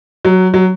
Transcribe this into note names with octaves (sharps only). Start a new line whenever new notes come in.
F#3
F#3